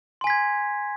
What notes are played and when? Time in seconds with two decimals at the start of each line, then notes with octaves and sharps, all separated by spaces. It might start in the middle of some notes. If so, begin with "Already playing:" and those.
0.21 C6
0.24 G#5
0.27 B6
0.30 G#6